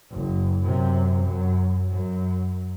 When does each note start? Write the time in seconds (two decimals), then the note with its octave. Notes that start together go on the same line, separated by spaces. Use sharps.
0.11 F#1
0.61 F#2 C3
1.24 F#2
1.90 F#2